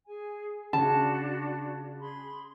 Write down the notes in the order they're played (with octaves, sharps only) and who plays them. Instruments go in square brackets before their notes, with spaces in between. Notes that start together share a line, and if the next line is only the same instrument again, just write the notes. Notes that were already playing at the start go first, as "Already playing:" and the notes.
[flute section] G#4 G#5
[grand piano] C#3 [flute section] D4 F#4 D5 [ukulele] A5
[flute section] G#4 B5 C6